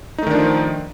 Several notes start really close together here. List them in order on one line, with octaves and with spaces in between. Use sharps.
D#4 A3 D#3 D4 F3